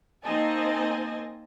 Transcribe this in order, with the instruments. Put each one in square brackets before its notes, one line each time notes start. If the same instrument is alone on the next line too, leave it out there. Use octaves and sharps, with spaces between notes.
[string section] A#3 C4 D#4 D#5 G#5 A5